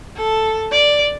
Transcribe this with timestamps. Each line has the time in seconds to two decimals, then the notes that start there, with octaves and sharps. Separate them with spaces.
0.17 A4
0.72 D5